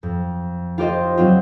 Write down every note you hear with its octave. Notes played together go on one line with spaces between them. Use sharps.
F2
F4 G4 C5 D#5
F#3 C4 F4